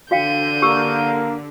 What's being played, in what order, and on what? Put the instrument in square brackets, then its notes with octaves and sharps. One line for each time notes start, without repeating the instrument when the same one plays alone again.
[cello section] D3 [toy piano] F#4 F5 G5 [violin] G6 D#7
[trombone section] A#3 [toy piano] G4 E6